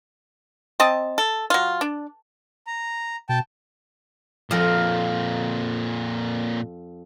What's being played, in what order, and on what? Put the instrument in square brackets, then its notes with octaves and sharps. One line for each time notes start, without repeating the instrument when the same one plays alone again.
[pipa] C4 D#5 A5
A4
F#3 F4
D4
[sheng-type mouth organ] A#5
[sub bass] B2 [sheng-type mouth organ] G5 A5
[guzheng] F2 A#4 [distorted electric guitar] A#2 C4